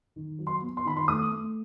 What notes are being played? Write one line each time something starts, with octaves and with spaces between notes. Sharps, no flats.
D#3
F#3
C6
B3
C6
D#3 B5
C6
A3 D#6
A3